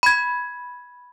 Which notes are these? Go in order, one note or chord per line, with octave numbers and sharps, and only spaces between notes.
B5 G#6